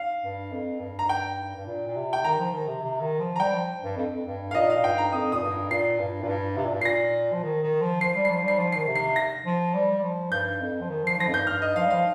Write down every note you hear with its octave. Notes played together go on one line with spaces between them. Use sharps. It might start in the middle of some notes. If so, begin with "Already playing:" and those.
Already playing: F5
G2
F2
G2
A#5
G5
G2
A#2
A#2
C3
G5
D#3 A#5
F3
D#3
C3
C3
D#3
F3
A#5
G3 G5
F3
G2
F2
F2
G2
F5
A#2 D#5
F5
A#2
G2 G5
A#5
F2 D#6
A#2 D#6
G2
A#2 C7
G2
A#2
G2
C3
A#2
G2
A#2 A#6 C7
F3
D#3
D#3
F3
F3 C7
G3
F3 C7
G3 C7
F3
D#3 C7
C3
C7
A#6
F3
G3
G3
F3
G2 G6
F2
F3
D#3
F3 C7
F3 A#6
F2
G2 G6
G2 F6
D#5
F3 F5
G3
F3 F5